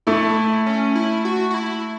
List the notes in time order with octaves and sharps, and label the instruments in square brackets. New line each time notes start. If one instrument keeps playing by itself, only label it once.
[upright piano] A3 [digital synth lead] E4
[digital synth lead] C#4
E4
F#4
F#4
E4